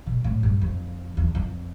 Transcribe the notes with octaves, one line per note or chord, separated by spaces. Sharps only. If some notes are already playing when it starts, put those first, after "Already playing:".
B2
A2
G2
F2
E2
F2